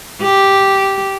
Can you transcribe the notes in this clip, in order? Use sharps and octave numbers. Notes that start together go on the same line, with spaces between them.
G4